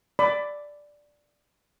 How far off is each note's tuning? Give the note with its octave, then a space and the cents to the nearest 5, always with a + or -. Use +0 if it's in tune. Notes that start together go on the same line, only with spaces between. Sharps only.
D5 +0 B5 +25